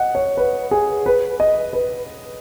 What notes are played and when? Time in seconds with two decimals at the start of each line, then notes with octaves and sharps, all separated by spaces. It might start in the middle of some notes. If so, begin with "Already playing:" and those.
Already playing: D#5 F#5
0.15 C#5
0.37 B4
0.71 G#4
1.06 B4
1.40 D#5
1.73 B4